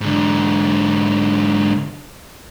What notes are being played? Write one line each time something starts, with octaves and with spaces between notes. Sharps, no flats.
G#2 D3